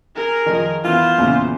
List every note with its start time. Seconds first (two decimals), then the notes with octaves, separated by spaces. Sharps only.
0.15 G#4 A#4
0.46 D#3 F3
0.84 E3 B3 F4 C5
1.18 E2 A#2 C#3